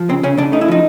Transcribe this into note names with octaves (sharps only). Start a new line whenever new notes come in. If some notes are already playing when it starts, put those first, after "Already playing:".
Already playing: F3
C#3 C4
C#3 C#4
C#3 D4
A3 D#4
E4
F3 D#4